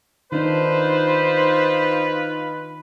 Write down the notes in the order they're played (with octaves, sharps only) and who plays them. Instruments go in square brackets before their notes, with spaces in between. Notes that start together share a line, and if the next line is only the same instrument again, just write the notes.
[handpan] D#3 D4 [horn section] D#4 F4 B4 [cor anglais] C5